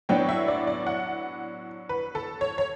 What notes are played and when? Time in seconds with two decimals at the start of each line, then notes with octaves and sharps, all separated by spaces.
0.09 A2 F#3 B3 D4 G5
0.29 E5
0.48 D5
0.67 D5
0.87 F#5
1.89 B4
2.15 A4
2.41 C#5
2.58 C#5